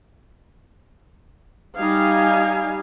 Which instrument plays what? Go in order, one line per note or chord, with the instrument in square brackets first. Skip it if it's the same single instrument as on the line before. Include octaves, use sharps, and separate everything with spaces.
[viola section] G3 D#4 G4 F5 G#5